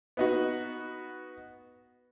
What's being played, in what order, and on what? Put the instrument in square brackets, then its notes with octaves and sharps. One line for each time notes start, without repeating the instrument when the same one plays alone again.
[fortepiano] B3 D#4 F#4